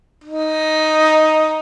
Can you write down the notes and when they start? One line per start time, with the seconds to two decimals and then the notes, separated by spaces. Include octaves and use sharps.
0.24 D#4